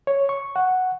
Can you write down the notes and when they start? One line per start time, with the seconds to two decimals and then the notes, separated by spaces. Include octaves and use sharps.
0.07 C#5
0.29 C#6
0.56 F#5